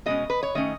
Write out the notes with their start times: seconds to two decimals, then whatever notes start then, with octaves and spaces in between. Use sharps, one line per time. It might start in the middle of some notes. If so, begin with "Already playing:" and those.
0.06 B2 G#3 C#4 D#5
0.30 B4
0.43 C#5
0.55 D#3 A3 C#4 D#5